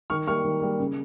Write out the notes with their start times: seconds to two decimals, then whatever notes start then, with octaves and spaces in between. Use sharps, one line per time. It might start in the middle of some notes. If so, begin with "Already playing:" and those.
0.10 D#3 C#6 F6
0.27 G3 A#3 C#6 F6
0.44 D#3
0.62 G3 A#3
0.79 C#3